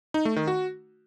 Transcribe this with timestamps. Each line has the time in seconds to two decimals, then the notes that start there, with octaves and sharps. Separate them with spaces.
0.14 D#4
0.25 A3
0.36 D#3
0.47 F#4